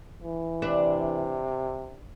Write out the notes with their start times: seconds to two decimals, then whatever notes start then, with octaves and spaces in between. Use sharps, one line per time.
0.21 E3
0.62 C3 D4 B4 E5